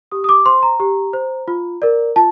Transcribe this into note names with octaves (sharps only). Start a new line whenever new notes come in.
G4 D#6
D#6
D6
C5 C6
A#5
G4
C5
F4
A#4 D5
F4 A5